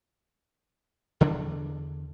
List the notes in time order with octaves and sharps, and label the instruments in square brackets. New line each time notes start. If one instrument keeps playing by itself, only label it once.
[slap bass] E2 D3 D4